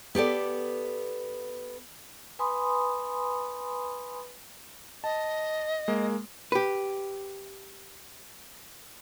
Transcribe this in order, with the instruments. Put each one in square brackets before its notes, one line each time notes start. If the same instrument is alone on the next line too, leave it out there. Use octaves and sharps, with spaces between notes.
[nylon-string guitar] B3 G4 A4 D5
[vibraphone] B4 G#5 B5 C6 D#6
[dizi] D#5 [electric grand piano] A5
[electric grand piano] G#3 A#3
[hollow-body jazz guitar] G4 B4